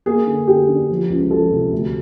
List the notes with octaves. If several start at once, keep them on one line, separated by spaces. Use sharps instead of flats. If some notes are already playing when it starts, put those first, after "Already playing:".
A#3 G#4
D3
D3 G4
D3
F3
C#2
F3 A4
C3
D2